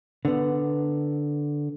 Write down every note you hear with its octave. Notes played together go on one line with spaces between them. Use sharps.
D3 B3